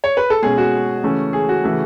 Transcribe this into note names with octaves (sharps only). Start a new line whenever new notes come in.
C#5
B4
A4
B2 G#3 C#4 G#4
F#4
C#3 E3 A3 C#4
G#4
F#4
C#3 E3 A3